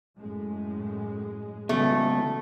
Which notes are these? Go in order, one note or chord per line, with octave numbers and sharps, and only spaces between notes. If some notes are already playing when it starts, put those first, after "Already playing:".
F#2 A2 G#3
C#2 G2 B2 E3 A3